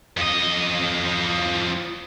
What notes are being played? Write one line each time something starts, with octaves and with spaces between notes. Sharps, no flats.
F2 D#5